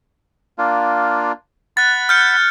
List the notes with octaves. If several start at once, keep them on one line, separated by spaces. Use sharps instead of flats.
A#3 D4 F4
F#5 B5 F#6 A6
F6 G6 C#7